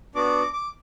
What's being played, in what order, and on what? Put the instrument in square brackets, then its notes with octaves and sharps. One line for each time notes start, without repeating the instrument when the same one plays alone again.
[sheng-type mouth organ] B3 D4 F#4 D6
D6